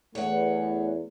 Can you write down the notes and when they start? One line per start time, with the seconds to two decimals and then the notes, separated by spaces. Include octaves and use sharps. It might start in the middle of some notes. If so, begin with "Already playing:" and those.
0.15 E2 A3 C#5 F#5